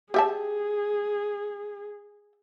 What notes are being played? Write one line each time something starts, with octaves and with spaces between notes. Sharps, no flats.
G4 G#4 E5 A5